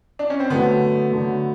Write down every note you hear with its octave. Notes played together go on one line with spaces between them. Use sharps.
D4
C#4
C4
D3 F#3 A3 B3
D3 F#3 A3